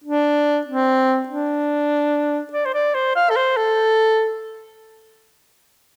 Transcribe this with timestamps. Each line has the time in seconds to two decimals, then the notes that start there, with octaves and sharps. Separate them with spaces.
0.04 D4
0.66 C4
1.28 D4
2.53 D5
2.65 C5
2.74 D5
2.94 C5
3.15 F5
3.30 A4
3.36 C5
3.57 A4